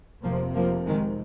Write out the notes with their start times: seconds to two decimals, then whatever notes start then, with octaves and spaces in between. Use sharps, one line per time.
0.23 F1 F2 C3 F3 A#3
0.55 F3 A#3
0.86 D#3 G#3